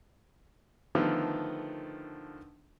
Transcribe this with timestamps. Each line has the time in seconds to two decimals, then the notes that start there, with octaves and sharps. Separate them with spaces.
0.95 D3 D#3 F3 A3 B3